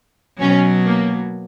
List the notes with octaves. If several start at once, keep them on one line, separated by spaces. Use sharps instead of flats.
B2 F#3 C#4
A#3